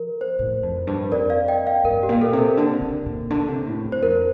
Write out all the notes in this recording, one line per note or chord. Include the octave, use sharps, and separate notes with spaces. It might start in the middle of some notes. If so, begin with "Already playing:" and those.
Already playing: F3 A#4
C5
A2
F2
G2
F2 A#4 D5
D5 F5
D#5 G5
D5 F5
G2 A#4
G4
A#2
A4
C3
A#4
D3
D3
A#2
D3
C3
A2
G2
C5
F2 A#4